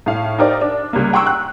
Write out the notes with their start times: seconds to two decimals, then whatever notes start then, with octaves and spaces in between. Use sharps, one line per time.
0.06 A2 F5
0.38 D#4 G4 A#4 C5 D5
0.61 D4
0.93 C#2 G3 A#3
1.13 F#5 G5 A#5 C6 C#6 E6
1.27 F#6